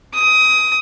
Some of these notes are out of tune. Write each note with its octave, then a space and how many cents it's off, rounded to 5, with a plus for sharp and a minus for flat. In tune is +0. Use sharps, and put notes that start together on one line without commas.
D#6 +20